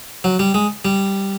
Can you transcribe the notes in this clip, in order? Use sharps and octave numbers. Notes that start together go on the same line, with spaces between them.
F#3
G3
G#3
G3